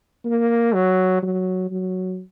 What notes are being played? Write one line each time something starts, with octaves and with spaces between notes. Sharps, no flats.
A#3
F#3
F#3
F#3